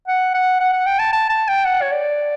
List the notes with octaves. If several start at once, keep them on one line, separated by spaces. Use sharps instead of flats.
F#5
F#5
F#5
F#5
G5
A5
A5
A5
G5
F#5
C#5
D5